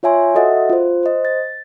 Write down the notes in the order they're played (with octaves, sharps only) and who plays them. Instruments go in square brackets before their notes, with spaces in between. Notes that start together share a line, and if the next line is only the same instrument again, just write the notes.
[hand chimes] F4 C#5 E5 G#5 C6
F#4 A4 D#5 E5 F#5
F4 C5
C5 D#5
A6